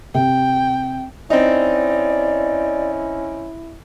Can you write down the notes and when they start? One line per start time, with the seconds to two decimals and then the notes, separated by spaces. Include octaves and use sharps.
0.14 C3 G5
1.30 C4 C#4 D#4 E4 D5